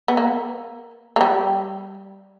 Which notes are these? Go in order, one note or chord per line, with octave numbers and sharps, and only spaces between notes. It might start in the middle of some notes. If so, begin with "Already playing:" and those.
B3
A#3
A#3
G3